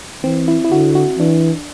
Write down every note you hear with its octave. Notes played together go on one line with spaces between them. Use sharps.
E3 C4
E4
E4
D3 F#4
F#4
E3 D4